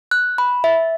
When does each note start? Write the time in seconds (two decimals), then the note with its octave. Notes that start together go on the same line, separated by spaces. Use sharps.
0.11 F#6
0.38 B5
0.64 E5